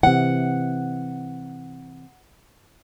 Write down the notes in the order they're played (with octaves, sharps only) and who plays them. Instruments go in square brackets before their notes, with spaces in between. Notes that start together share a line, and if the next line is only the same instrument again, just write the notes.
[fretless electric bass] C3 E3 [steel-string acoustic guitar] F#5